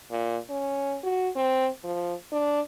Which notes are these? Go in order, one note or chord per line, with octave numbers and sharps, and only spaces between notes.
A#2
C#4
F#4
C4
F3
D4